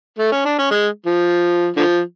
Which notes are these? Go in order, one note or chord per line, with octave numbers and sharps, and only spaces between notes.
A3
C#4
D4
C#4
G#3
F3
D3 F3